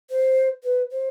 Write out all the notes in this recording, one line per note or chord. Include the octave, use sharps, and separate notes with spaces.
C5
B4
C5